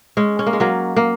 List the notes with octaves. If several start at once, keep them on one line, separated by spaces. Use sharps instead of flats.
G#3 C#4
C#4
A#3
G#3
F#3 A#3
A#3